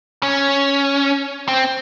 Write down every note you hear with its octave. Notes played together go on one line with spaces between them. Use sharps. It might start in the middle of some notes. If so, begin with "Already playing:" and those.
C#4
C4